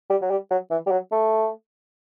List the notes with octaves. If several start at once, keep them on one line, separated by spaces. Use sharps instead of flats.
G3
F#3
G3
F#3
E3
G3
F#3
A3